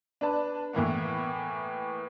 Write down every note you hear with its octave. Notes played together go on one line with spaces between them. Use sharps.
D4 B4 A5
A2 E3 A#3 B3